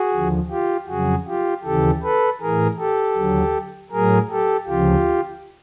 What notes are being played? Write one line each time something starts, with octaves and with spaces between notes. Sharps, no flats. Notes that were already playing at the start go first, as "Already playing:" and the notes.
Already playing: F#4 G#4
D#2 D3 F3
F4 G4
F2 C#3 F#3 F#4 G#4
F4 G4
D#2 C#3 E3 G4 A4
A4 B4
A2 E3 G#4 A#4
G4 A4
D#2 D3 F#3
A2 F#3 G#4 A#4
G4 A4
D2 C#3 F3 F4 G4